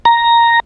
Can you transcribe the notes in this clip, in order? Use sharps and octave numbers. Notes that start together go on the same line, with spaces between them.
A#5